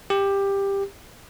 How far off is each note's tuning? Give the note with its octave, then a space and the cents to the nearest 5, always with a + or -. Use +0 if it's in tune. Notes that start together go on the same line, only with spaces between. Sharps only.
G4 +15